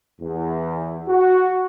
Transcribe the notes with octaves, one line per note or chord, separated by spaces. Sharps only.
E2
F#4